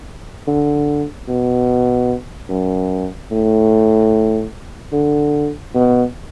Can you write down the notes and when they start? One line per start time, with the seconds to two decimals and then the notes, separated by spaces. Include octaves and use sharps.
0.47 D3
1.28 B2
2.49 F#2
3.31 A2
4.93 D3
5.75 B2